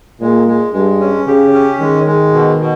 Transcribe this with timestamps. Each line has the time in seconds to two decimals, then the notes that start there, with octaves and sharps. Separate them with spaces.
0.20 A#2 G#3
0.48 G#3
0.73 G2 G#3
1.00 C#4
1.27 C#3 G4
1.53 C#4
1.80 D#3 G#3
2.06 G#3
2.33 B2
2.59 B2